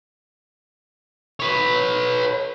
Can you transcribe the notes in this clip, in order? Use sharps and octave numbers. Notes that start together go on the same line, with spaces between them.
B4 C#5